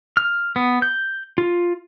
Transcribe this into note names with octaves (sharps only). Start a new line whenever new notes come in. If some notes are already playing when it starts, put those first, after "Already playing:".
F6
B3
G6
F4